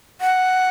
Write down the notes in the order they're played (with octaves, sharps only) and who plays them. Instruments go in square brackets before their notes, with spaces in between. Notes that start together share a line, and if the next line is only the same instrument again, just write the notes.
[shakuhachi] F#5